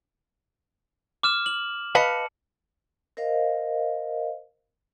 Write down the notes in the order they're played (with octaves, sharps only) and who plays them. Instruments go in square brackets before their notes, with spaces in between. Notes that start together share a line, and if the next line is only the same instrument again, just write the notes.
[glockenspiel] D6 F6 E7
F#7
[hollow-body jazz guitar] B4 D#5 F5 [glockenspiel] A5 C#7
[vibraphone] A#4 C5 D#5 F5